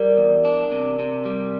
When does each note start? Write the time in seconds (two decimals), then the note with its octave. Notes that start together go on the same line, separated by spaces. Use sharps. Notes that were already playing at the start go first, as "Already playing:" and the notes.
Already playing: G3 A#4 D5
0.17 E2
0.45 D4
0.72 C3
0.99 C3
1.25 G3